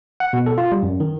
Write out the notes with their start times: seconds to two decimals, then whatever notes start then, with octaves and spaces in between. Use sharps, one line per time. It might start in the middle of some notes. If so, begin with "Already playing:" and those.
0.20 F#5
0.33 B2
0.46 A4
0.58 F4
0.72 G3
0.83 F#2
1.00 D#3